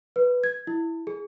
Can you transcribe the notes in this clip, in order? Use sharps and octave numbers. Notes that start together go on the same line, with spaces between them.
B4
G#6
E4
G#4